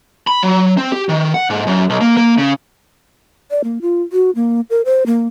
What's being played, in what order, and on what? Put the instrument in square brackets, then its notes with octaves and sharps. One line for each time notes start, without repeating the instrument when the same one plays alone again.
[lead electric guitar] B5
F#3
C4
G4
D#3
F#5
G#2
F#2
B1
A#3
A#3
C#3
[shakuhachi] D5
A#3
F4
F#4
A#3
A#4
C5
A#3